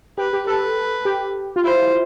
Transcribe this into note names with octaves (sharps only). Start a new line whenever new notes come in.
G4 B4
G4
A4 B4
G4
F4
E4 C5